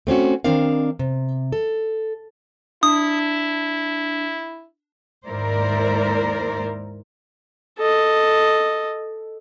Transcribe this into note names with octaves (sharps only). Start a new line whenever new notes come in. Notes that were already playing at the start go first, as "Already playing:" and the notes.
A3 C4 C#4 F#4
D#3 C4 D4 A#4 F5
C3
A4
D4 E4 D#6
D#2 G#2 E4 A#4 C5 D5
A4 D#5